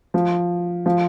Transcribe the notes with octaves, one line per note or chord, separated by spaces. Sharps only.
F3
F3